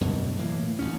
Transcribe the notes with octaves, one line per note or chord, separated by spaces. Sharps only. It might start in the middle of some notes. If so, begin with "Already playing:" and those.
F#2 B2 D3
A2 E3 A#3
A1 D2 C#4